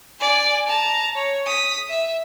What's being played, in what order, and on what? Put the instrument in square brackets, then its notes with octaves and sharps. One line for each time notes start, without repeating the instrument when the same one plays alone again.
[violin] D5 G#5
A5 A#5
C#5
D#6 B6
E5